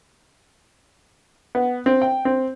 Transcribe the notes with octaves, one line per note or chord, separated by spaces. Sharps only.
B3
C4
G5
C4